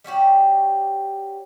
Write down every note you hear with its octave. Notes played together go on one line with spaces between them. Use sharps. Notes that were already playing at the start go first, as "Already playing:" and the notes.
G3 C#4 F#4 G4